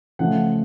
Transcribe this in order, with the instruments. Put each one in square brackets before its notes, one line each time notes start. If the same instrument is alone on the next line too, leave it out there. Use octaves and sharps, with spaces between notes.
[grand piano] C#3 F3 A3 F#5